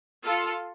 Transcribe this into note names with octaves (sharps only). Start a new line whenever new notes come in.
F4 A4